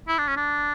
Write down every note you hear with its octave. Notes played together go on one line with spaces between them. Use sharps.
E4
D4
C#4
D4